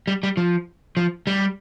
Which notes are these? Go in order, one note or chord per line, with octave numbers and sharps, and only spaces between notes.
G3
G3
F3
F3
G3